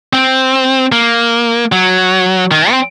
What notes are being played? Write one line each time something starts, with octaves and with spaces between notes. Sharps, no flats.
C4
A#3
F#3
D#3
C4